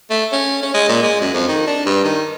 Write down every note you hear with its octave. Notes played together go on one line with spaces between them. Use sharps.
A3
C#4
C#4
G#3
A#2
G#3
F#2
F2
D#3
D4
G2
D#3